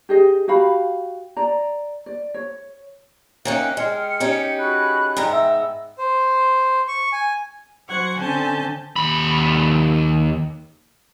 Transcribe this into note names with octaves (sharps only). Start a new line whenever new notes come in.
G4 G#4 D#5
F#4 G4 F5 B5
D5 A#5
D5
C#5
A#3 C#4 D#4 E5 G5 F#6
G#3 G5 F6 C#7
C#4 D#4 G4
F#4 G#4 B5 F#6
G#2 B3 G5 A#5
E5 E6
C5
C#6
G#5
F#3 C5 F#5 C#6 G#6
D3 C4 C#4 G#5 A5 G6
D#2 B5